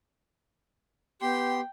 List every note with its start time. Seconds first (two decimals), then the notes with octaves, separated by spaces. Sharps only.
1.21 B3 G4 G5 C6